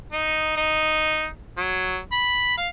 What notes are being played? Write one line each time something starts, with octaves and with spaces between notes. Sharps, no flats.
D#4
D#4
F#3
B5
F5